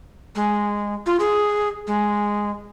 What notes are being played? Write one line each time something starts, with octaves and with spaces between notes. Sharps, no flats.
G#3
F4
G#4
G#3